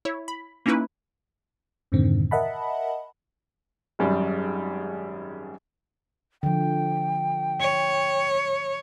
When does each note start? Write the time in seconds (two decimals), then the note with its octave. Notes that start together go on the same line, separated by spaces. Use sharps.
0.05 E4 C#5
0.28 B5
0.66 A#3 C#4 D#4 E4 B4
1.92 F2 G#2 B2 D3 D#3 C4
2.31 A#4 D#5 E5 F#5 A5 B5
3.99 G#1 F#2 G3
6.43 D3 F3 G5
7.61 C#5